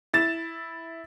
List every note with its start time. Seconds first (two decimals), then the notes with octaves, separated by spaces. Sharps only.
0.13 E4 A6 E7